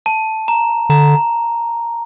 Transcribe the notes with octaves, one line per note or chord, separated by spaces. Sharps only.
A5
A#5
D3 A#5